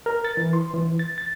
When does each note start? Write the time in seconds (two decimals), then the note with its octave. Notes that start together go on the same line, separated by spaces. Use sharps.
0.06 A#4
0.25 A6
0.37 E3
0.53 C6
0.74 E3
0.99 A6
1.18 A6